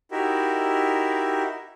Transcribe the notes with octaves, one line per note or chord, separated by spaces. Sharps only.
D#4 E4 F#4 G4 A#4 E5